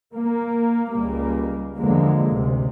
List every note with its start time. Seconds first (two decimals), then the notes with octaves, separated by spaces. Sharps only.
0.12 A#3
0.91 C#2 G3 A#3
1.77 E2 D3 F3 G#3 A#3
2.28 A1 D2 C3